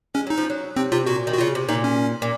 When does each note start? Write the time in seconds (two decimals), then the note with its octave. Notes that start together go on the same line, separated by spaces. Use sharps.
0.15 G#3 C#4
0.27 F#3 D#4
0.38 F3
0.50 F#3
0.76 C3 C4
0.92 C3 F4
1.06 A#2 F#4
1.27 D#3
1.33 F#4
1.38 C#3 F4
1.55 C3
1.69 A#2 D#4
1.84 C#4
2.22 A#2